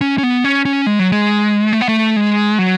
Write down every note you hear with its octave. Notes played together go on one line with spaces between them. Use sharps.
C#4
C#4
B3
C#4
C#4
G#3
F#3
G#3
A3
B3
A3
G#3
F#3